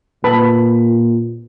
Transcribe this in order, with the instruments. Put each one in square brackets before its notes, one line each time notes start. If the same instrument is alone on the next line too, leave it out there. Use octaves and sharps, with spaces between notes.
[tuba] A#2 [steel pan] B4 A5 B5